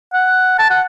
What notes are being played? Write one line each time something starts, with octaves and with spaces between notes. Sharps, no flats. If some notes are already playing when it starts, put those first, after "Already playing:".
F#5
A5
F#5